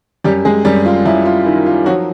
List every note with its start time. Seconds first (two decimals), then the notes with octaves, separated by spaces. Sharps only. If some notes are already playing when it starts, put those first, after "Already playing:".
0.24 F#2 G3 G4
0.45 G#3 G#4
0.65 F#2 G3 G4
0.86 F4
1.05 F#2 E4
1.25 F4
1.46 D#3 E4
1.66 F4
1.86 F3 F#3 F#4